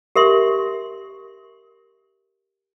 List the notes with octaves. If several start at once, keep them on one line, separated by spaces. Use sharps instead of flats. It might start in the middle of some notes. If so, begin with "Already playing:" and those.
G4 A#4 E5 C6